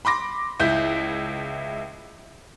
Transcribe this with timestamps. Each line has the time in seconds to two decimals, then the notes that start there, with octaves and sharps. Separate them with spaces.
0.05 B5 C6 D6 A#6
0.60 C#2 E4 G6